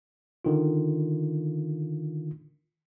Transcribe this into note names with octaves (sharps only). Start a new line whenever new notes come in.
D3 D#3 F4